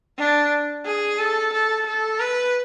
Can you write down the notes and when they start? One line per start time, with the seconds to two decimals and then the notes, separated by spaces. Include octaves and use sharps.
0.18 D4
0.86 G#4
1.19 A4
1.53 A4
1.87 A4
2.20 B4